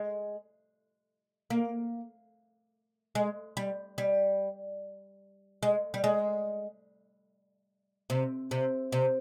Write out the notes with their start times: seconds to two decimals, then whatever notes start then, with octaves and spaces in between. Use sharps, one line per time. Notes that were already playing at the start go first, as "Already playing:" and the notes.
Already playing: G#3
1.50 A#3
3.15 G#3
3.57 G3
3.98 G3
5.63 G#3
5.94 G3
6.04 G#3
8.10 C3
8.51 C3
8.92 C3